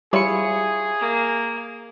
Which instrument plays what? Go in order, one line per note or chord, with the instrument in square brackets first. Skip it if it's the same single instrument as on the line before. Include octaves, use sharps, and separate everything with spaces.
[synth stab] G3 C#7 [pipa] E4 F4 C#5 [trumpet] G#4
[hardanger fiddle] A#3